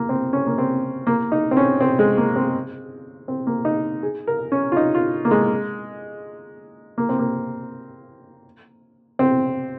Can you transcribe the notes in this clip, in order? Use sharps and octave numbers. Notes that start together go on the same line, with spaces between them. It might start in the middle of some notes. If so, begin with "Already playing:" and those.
Already playing: A#3
C4
C#4
A#3
C4
A#3
D#4
C4
C#4
C4
G#3
A#3
C4
C4
A#3
D#4
G#4
A#4
C#4
F4
D#4
F4
A#3
G#3
A#3
C4
A#3
C4